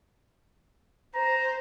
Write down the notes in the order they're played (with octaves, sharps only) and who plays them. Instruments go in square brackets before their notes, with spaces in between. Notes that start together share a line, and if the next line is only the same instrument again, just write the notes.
[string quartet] C5 [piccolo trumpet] A#5